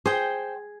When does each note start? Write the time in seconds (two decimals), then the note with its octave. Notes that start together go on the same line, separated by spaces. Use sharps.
0.06 G#4 C5 G5